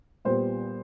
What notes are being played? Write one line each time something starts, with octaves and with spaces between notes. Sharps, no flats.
A#2 G3 B3 C5